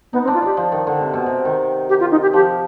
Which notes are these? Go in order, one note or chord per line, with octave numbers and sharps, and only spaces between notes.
B3 D#4
C4
D4
F4
D4 G4
F3
D#3
D3
C3
B2
C3
D#3
G4
F4
D#4
G4
F3 G4